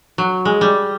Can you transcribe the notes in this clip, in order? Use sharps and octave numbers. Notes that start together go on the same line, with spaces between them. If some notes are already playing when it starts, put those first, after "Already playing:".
F#3
G#3
G3